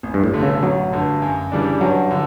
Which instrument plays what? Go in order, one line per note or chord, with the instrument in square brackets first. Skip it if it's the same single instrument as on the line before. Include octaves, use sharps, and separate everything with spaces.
[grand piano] A1
[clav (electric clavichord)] G2
A2
[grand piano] G2 D3 A3
[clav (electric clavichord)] C#3
[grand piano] A1 [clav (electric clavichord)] F#3
[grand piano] G2 D3
F#2
C#3 E3 G3 D4
[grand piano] G2 [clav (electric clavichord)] F#3
[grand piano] D3